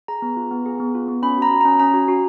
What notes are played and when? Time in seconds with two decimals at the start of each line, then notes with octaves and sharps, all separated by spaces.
0.08 G#4 A#5
0.22 B3
0.37 F4
0.51 B3
0.66 G#4
0.80 B3
0.95 F4
1.08 B3
1.23 C#4 B5
1.37 F#4
1.42 A#5
1.51 F#4
1.61 C#4 A#5
1.80 C#4 A#5
1.94 F#4
2.08 F#4